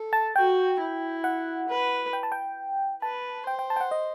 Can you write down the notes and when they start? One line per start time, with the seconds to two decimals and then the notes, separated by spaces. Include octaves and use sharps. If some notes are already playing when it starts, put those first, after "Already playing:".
Already playing: A4
0.13 A5
0.36 F#4 G5
0.80 E4
1.24 F#5
1.69 B4
2.13 G5
2.23 A5
2.32 G5
3.02 B4 A5
3.47 C5 G5
3.59 G5
3.70 A5
3.76 G5
3.80 F#5
3.91 D#5